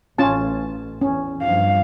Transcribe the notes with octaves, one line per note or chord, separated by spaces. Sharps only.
A1 C#4 F4 A5
E2 C#4
G2 F3 F5